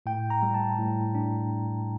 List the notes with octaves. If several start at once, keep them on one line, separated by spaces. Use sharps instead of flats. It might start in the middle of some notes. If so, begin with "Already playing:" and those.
A2 G5
A#5
G3
A5
A2
D4